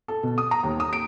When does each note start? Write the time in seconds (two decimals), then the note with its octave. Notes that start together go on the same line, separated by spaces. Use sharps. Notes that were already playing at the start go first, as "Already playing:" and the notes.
0.08 A4
0.23 B2
0.38 D#6
0.51 A#5
0.63 D#2
0.80 D#6
0.93 D7